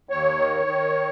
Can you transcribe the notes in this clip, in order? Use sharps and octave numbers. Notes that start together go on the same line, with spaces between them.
D#2 C#5
D#3
D#3